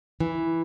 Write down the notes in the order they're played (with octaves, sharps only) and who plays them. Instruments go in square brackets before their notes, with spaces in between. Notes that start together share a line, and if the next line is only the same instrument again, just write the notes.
[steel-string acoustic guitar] E3